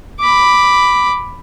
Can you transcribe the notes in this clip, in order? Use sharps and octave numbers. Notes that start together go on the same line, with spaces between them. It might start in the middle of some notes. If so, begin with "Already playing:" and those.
B5 D6